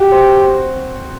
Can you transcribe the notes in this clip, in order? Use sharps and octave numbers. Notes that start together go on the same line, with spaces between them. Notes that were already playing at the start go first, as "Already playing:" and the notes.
Already playing: F#4 G4
C4
C4